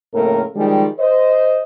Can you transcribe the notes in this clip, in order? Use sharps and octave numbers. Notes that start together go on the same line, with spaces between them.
F2 A2 C#3 A#3 A#4
D#3 F3 G3 G#3
C5 D#5